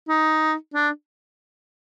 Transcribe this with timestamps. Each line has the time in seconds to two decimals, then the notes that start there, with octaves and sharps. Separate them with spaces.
0.09 D#4
0.74 D4